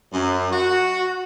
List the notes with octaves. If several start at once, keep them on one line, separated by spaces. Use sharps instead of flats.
F#2
F#4